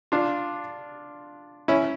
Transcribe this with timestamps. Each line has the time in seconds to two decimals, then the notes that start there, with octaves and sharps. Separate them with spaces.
0.12 D4 F4
1.68 C#4 E4